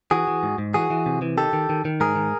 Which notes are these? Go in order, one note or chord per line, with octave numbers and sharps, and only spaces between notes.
E3 F#4 G#4
E3
G#2
G#2
E3 F#4 G#4
E3
C3
E3
D#3 G4 A4
D#3
D#3
D#3
G#2 G#4 A#4
D#3